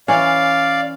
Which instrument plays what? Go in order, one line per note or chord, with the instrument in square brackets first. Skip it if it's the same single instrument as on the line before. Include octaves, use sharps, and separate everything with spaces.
[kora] E3 C#4 [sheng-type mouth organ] D5 F5